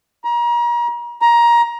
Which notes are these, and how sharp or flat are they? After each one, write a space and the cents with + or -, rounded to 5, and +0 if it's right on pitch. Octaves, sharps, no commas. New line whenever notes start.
A#5 +35
A#5 +20